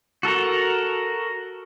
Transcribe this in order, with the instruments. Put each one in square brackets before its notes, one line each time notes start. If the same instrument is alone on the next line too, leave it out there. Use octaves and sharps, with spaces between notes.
[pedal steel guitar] F#4 A4 A#4